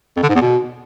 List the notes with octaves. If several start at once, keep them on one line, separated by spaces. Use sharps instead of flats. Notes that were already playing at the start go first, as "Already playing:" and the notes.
F2
D3
G#2
E2
B2